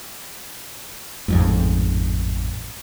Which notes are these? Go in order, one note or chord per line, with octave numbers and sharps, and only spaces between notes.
A1 F2 G#2